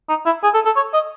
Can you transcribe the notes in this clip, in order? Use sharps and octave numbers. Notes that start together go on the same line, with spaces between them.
D#4
E4
G#4
A4
A4
C#5
D#5